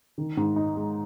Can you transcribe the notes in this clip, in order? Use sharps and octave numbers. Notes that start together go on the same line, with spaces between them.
D#3
G#2
D#4
G#3